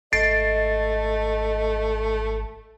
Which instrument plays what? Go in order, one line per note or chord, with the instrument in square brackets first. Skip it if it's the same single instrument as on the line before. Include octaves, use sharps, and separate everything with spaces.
[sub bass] G#1 [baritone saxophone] A3 [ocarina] D#5 [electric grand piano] A6 C7 D7